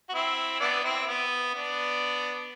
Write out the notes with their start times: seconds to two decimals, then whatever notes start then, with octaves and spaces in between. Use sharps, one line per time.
0.09 F#4
0.14 C4 E4
0.60 B3 D4
0.84 C4 E4
1.07 B3
1.54 B3 D4